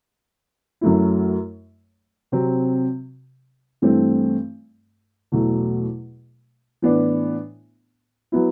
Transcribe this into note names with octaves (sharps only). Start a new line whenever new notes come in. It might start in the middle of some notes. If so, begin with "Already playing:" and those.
F#2 F#3 A3 E4
C3 F#3 C4
G2 E3 A3 C4
E2 B2 F#3 A3
A2 E3 B3 D4
F#3 B3 E4